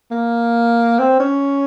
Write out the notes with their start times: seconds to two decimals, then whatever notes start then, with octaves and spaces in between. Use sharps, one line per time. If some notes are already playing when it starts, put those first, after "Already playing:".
0.11 A#3
0.99 C4
1.20 C#4